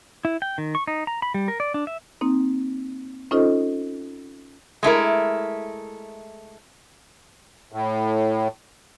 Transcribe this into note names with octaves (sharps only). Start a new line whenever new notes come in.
E4
G5
D#3
C#6
D#4
A#5
B5
G3
A#4
D5
D4
E5
A#3 C4 D#4
C#4 D#4 F4 A4 C5 D#5
G#3 A3 E4 A#4
A2